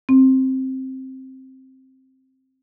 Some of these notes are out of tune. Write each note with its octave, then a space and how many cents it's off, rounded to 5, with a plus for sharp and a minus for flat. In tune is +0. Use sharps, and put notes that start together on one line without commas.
C4 +5